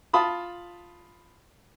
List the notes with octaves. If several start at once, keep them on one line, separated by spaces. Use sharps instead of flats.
F4 A5 B5 D#6